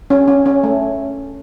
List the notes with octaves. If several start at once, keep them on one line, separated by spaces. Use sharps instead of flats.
C#4
C#4
C#4
A3